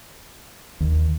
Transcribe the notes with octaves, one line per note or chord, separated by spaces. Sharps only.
D#2